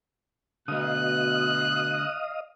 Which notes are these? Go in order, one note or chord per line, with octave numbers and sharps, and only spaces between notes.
B2 D3 A3 D#5 F5 D#6 F#6